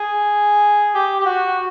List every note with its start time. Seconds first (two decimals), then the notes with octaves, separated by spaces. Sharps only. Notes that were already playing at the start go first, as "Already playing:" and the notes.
Already playing: G#4
0.95 G4
1.20 G4
1.26 F#4